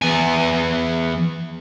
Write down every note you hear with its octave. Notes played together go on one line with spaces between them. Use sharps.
E2 G#5